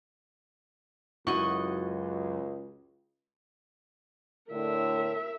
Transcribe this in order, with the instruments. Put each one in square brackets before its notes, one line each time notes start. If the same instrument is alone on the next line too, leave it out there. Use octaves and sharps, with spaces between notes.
[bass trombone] C#2 [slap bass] F#2 [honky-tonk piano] E4 F#4 F#7 [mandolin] D#5 C#6
[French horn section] A2 D3 [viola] A#4 E5